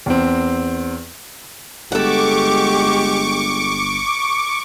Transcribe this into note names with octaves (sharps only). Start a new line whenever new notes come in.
E2 C4
G1 G#3 G4 A4 F#5 C#6 D6